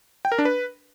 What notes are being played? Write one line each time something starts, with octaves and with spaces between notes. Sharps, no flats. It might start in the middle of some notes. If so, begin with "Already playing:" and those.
G5
A#4
D4
B4